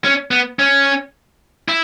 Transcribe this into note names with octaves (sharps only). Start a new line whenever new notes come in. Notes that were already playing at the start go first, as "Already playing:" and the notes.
C#4
B3
C#4
E4